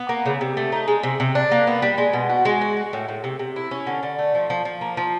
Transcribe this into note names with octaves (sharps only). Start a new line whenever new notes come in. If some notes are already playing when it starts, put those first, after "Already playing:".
Already playing: B3
A#3
C#3
C3
A3
D#4
G#3
C3
C3
D4
A#3
B3
G3
G#3
B2
F#4
G#3
F#4
F#4
A2
A2
C3
C3
E4
C#4
D3
D3
A3
F3
F3
F3
A#3
F3